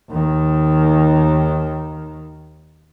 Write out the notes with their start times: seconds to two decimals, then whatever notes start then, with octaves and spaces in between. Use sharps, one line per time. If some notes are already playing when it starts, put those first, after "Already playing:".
0.11 D#2 D#3